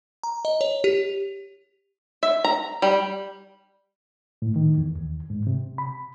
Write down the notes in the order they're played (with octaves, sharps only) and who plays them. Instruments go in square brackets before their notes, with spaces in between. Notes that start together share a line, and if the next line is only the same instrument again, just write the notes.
[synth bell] A#5
D#5
C#5
G4
[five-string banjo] E5
A#5
G3
[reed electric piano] A2
D#3
E2
D#2
G#2
C3
B5